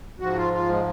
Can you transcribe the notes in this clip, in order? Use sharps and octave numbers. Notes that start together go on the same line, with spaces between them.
G#2 F3 F#4
F4
F4
G#3